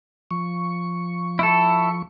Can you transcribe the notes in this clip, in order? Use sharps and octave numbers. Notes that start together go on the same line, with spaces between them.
F3 C#6
E4 A4